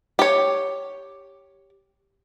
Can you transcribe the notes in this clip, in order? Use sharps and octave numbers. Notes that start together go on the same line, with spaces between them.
G4 C#5